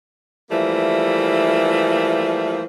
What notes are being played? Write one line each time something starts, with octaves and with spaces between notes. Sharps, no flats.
E3 F3 G3 A3 A#3